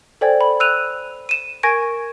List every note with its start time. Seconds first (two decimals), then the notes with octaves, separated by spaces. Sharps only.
0.21 A4 C5 D5 G5 G#5 G#6
0.41 B5
0.60 E6 F#6 D#7 F7
1.29 D#7 E7
1.63 A#4 G#5 C#6 G#6 A#6 D7